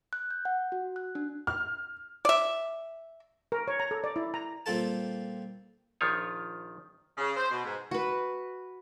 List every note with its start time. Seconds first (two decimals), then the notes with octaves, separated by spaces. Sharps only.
0.13 F#6
0.31 G6
0.45 F#5
0.72 F#4
0.96 F#6
1.15 D4
1.47 F6
2.25 D5 E5
3.52 A#4
3.68 C#5
3.80 A#5
3.91 A4
4.04 D5
4.16 E4
4.34 A#5
4.66 A#2 G3 C4 F4 A4 A5
6.01 A#1 D#3 F3 F4 C#5
7.16 C#3
7.37 C5
7.50 B2
7.65 G#2
7.91 F#4 B4